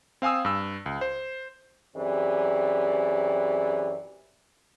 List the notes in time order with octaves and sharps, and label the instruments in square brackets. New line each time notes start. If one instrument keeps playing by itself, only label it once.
[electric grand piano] C4 F5 G#5 D#6 E6
G2 E6
C#2
C5
[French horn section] F#2 E3 C4 G4 G#4 D5